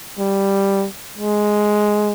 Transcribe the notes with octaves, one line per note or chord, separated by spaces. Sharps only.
G3
G#3